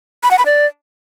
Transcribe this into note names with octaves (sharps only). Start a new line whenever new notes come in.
B5
F#5
B5
D5